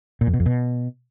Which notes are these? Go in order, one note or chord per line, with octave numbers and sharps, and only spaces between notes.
A#2
F2
B2
F2
B2